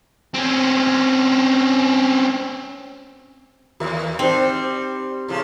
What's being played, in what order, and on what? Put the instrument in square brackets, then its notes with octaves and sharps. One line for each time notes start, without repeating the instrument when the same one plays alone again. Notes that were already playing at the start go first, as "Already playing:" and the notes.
[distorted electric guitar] C4 C#4
[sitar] D#2 [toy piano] F#4 A#4 E5
[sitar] G3 [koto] C4 [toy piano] D#4 C5
[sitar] A2 C#3 F3